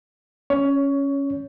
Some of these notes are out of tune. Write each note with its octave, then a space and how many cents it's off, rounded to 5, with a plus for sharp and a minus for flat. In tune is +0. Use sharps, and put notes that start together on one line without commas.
C#4 +0 C#5 +20